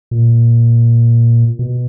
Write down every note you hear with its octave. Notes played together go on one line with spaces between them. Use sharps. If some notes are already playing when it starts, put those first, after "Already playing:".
A#2
B2